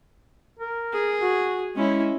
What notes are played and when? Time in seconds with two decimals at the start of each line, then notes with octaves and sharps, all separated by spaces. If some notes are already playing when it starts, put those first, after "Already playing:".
0.59 A#4
0.93 G#4
1.22 F#4
1.77 G#3 C#4 E4